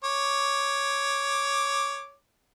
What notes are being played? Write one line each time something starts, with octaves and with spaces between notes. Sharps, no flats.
C#5 D6